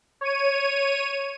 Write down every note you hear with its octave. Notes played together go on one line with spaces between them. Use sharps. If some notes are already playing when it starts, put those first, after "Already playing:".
C#5 D#7